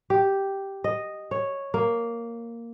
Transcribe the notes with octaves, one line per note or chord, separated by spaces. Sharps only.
G4
D#5
C#5
A#3